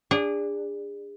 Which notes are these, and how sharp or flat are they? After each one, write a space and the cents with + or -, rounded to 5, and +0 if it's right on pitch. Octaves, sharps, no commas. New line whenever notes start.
D4 -5 G#4 -30